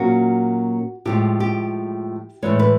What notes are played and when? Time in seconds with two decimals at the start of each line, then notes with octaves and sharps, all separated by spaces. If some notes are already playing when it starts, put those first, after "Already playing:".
Already playing: A#2 F#3 A#3 C#4 F#4
1.05 A2 F3 G#3 G4
1.40 G4
2.42 A2 E3 G#3 C#5
2.59 B4